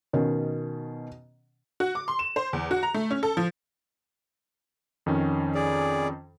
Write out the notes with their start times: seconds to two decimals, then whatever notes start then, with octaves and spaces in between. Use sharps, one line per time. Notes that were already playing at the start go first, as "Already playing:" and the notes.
0.13 B2 D#3 C#4
1.80 F#4
1.95 D6
2.08 C6
2.19 E7
2.36 C5
2.53 E2
2.71 F#4
2.83 A#5
2.94 A3
3.11 C#4
3.23 A4
3.37 F3
5.06 F2 D#3 C#4
5.55 G#4 D5